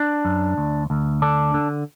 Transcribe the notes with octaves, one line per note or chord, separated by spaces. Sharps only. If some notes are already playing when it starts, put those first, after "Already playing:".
Already playing: D4
F#2
D2
D2
D3 D4
D3